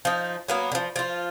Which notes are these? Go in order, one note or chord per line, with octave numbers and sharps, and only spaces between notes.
F3 D#4
F#3 A#3 B3
D3 F3
F3 F4